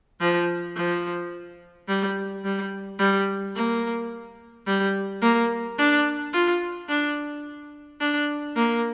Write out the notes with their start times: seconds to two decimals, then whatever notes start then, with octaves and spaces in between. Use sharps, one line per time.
0.21 F3
0.76 F3
1.89 G3
2.44 G3
2.99 G3
3.55 A#3
4.66 G3
5.22 A#3
5.78 D4
6.33 F4
6.89 D4
8.00 D4
8.56 A#3